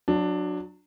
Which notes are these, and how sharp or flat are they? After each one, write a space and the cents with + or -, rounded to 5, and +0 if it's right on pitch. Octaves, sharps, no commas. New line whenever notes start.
F#3 -15 D4 +10